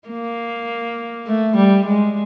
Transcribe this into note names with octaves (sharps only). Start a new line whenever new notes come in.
A#3
A3
G3
G#3